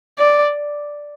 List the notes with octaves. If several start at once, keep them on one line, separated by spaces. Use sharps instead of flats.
D5